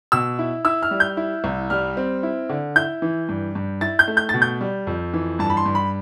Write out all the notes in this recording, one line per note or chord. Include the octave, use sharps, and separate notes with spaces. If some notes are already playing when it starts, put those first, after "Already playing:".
B2 E6
E4
E4 E6
F6
G3
G6
E4
C2
G3 F6
C4
E4
D3
E4 G6
E3
G2
G2
E4 A6
G6
A3
G6
B2 A6
G6
G3
F2
E3
G2 A5
B5
C6
G2
B5